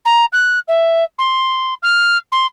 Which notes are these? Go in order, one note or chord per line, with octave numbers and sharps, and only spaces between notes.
A#5
F#6
E5
C6
F6
C6